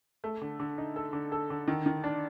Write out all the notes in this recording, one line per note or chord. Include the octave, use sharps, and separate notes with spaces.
A3
D3
D3
D#4
A4
D3
A4
D3
D#3
D#3
D4